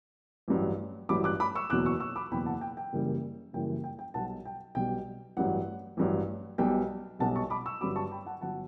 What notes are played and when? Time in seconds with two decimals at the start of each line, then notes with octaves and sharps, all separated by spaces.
0.48 A1 G2 F#3
1.09 A1 G2 F#3 B5 D6
1.24 D6 F#6
1.40 B5 D6
1.55 C#6 E6
1.70 F#1 E2 B2 F#3 D6 F#6
1.85 C#6 E6
2.00 C#6 E6
2.16 B5 D6
2.31 F#1 E2 B2 F#3 G5 B5
2.46 F#5 A5
2.61 G5
2.77 G5
2.93 F#1 F#2 C#3 E3 G3
3.53 F#1 F#2 C#3 E3 G3 G5
3.84 G5
3.99 G5
4.14 B1 B2 G3 F#5 A5
4.45 G5
4.75 B1 B2 G3 G5
5.37 A1 G2 F#3 F#5
5.97 A1 G2 F#3
6.58 B1 B2 G3 G5
7.19 B1 B2 G3 F#5 A5
7.36 A5 C#6
7.50 B5 D6
7.66 C#6 E6
7.81 G1 G2 F#3 B5 D6
7.96 A5 C#6
8.12 G5 B5
8.26 F#5 A5
8.41 G1 F#3 F#5 A5